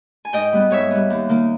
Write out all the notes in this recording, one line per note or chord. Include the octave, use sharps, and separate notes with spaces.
G#5
G#2 D#5 G5
G3 B3
G#2 C#5 E5
G3 B3
D#2
D#3 A#3